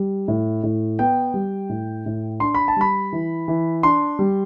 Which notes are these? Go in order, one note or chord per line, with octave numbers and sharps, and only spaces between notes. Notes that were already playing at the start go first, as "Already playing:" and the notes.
Already playing: G3
A2
A2
B3 G5
G3
A2
A2
D4 C6
B5
A5
G3 B5
E3
E3
D4 C6
G3